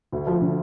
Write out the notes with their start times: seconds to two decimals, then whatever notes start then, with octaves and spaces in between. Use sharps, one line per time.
0.12 D2
0.27 F3
0.41 D3